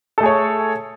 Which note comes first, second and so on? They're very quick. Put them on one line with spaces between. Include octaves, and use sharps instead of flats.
A4 A3 G#4 C#5